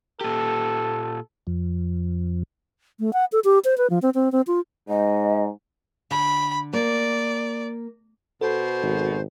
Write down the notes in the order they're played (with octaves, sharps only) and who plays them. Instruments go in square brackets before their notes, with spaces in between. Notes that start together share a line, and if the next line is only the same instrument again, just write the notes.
[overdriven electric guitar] A#2 G4 [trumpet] A4
[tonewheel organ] F2
[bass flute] A3
F#5
A4
G4
C5
B4
F3
C4
C4
C4
F4
[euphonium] G#2 [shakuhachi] D#5
[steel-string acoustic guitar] D3 [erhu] B5
[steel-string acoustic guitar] A#3 [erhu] D5
[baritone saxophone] B2 [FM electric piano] A4 [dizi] C5
[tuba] G#1